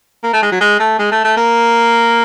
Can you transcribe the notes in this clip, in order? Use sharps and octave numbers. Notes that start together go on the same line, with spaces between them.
A#3
A3
G#3
F#3
G#3
A3
G#3
A3
A3
A#3